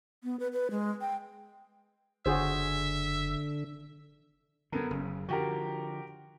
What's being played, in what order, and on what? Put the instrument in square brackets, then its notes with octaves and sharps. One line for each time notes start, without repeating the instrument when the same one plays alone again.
[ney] B3
B4
B4
G#3
G5
[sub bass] F#1 [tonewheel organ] D3 [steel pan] F#4 G#4 C5 [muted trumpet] E5
[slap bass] F#2 D3 [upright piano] B3 A4 A#4
[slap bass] F#1 [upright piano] C#3
[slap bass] D3 F3 [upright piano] F#4 G4 A#4